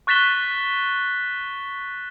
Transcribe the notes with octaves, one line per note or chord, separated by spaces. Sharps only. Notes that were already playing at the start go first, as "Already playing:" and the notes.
C#6 F#6 A6 B6 E7 G7